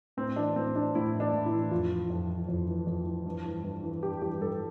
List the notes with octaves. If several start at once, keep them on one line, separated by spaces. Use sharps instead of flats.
A2 C4
E3 D4
A2 C4
E3 D4
A2 E4
E3
D4
A2
E4
E3
F2 F4
E3
F2
E3
F2
E3
F2
E3
G2
E3
G2
E3
G2 G4
E3 G4
G2 A4